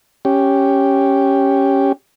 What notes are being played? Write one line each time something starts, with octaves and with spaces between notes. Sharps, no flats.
C#4 G4